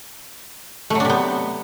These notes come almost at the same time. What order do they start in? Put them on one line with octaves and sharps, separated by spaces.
A3 F#3 D4 C3 B3